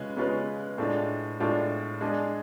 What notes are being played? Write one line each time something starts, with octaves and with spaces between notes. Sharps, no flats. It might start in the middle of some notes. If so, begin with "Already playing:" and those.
Already playing: C#3 G#3 C#4 F4 B4
C#3 G#3 C#4 F4 B4
A2 G#3 D4 F4
A2 G#3 D4 F4
G#3 D4 G#4